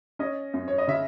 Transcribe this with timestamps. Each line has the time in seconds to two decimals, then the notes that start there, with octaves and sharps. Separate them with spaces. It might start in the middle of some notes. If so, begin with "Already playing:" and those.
0.19 C#4 D#5
0.54 F#2
0.68 C#5
0.78 D#5
0.88 C#3 E5